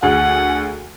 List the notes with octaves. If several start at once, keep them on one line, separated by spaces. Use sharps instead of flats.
D2 G#4 F#5